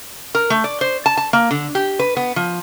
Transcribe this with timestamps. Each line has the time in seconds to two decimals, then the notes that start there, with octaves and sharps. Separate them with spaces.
0.35 A#4
0.50 A3
0.64 D5
0.81 C5
1.06 A5
1.17 A5
1.33 A#3
1.51 D3
1.75 G4
1.99 B4
2.17 B3
2.36 F3